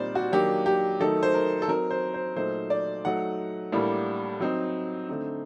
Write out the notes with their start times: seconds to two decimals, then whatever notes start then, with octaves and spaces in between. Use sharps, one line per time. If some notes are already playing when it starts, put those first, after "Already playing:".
Already playing: A#2 G3 C4 D#4 C5 D5
0.15 F#4
0.32 D#3 F#3 A#3 D4 G4
0.66 G4
1.00 D#3 F#3 A3 D#4 A4
1.23 C5
1.34 A#4
1.62 A4
1.68 F#3 C4 D#4 A#4
1.91 C5
2.14 C5
2.36 A#2 F#3 A3 D#4 C5
2.70 D5
3.05 F#3 A3 D#4 F#5
3.72 A2 G3 A#3 D4
4.40 F#3 C4 D#4
5.09 D3 A3 C4 D#4